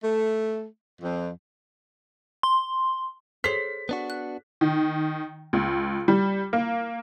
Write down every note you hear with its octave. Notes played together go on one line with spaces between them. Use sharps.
A3
F2
C6
G#4 A4 C5 C#5 B6
B3 D4 F#4
F#6
D#3
C#2
G3
A#3